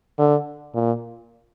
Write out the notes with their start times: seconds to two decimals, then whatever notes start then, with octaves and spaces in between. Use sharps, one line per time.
0.19 D3
0.75 A#2